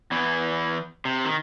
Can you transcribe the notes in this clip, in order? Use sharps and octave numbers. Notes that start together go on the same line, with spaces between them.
E2 E3
C3
D#3